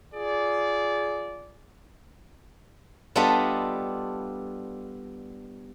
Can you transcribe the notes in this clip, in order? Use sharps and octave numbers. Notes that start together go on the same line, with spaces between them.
F4 G#4 D5
G3 B3 D4 F4 A4 D#5